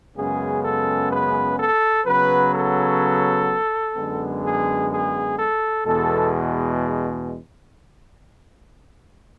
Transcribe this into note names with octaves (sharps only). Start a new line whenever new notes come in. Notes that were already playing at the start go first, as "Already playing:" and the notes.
F#2 C#3 G#3 B3 G#4
A4
B4
A4
C#3 F#3 B3 B4
A4
F#2 D3 G#3 B3
G#4
G#4
A4
E2 B2 G#3 A4